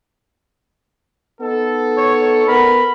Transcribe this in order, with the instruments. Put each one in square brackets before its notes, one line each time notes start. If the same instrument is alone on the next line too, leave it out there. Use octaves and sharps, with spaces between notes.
[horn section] B3 D#4 A4
[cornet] C#5
[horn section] B3 A#4 [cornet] B5